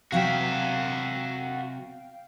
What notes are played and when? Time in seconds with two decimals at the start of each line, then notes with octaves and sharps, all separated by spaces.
0.12 C3 F#3 F#4 E5 F5 G5